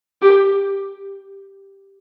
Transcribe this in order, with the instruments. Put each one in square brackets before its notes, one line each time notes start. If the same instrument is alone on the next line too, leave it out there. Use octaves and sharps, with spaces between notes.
[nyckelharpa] G4